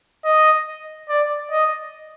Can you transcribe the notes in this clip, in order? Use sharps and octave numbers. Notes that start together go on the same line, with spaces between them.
D#5
D5
D#5